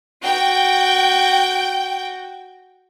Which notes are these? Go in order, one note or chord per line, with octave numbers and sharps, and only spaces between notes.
F#4 G5